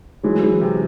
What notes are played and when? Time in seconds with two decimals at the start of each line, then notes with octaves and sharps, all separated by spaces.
0.23 E3 F#3 G#3
0.43 E3
0.61 C3